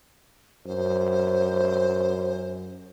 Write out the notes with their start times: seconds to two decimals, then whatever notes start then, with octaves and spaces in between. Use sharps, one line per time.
0.66 F#2 C5